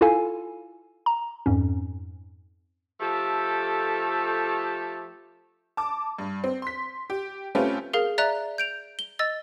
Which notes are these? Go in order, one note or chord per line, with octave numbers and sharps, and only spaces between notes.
E4 F4 A4 F5 G#5
A#5
F2 G#2 C#4
F3 A3 G4 A4
A5 D6
G2
C4
C6 B6
G4
A3 C4 C#4 F4 G4 B4
G#4 A#4 F5
D5 E5 A#5 F#6
G6 D7 F7
G7
D#5 E6 A6